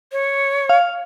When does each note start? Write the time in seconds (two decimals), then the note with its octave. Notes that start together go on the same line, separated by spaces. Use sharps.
0.12 C#5
0.69 F5